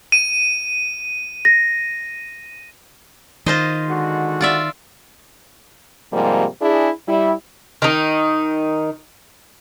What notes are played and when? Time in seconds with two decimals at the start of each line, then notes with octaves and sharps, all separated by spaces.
0.12 D#7
1.45 A#6
3.46 D#3 F4 C5 D#5
3.88 D3 G#3 F#4
4.41 F4 D5 E5
6.13 G#2 C3 F3 G3 A#3
6.62 D4 E4 G#4
7.08 G3 E4
7.82 D#3 D#4